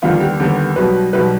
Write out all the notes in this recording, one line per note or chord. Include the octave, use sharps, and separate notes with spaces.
D#2 D3 G3 B3 F4
G4
D#2 D3 G3 B3
B1 B2 G3 B4
B1 B2 G3 B4